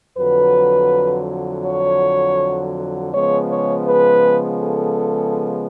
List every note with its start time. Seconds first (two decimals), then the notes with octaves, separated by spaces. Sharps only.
0.18 F2 D3 F#3 B4
1.65 C#5
3.13 C#3 F3 G#3 B3 C#5
3.50 C#5
3.87 B4
4.60 A4